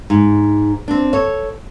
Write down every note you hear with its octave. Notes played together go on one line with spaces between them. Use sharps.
G#2
C4 D4
A4 C#5